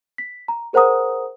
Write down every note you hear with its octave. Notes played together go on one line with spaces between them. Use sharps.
B6
A#5
G#4 A#4 C5 F#5 A#5 D#6